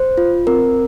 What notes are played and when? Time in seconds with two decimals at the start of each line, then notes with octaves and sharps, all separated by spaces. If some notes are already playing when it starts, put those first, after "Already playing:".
Already playing: C5
0.18 F4
0.47 C4 A#4